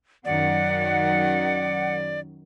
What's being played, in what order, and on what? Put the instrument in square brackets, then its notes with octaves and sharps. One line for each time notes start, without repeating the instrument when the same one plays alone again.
[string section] F#2 D#3 F#3 [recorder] D5 [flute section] F#5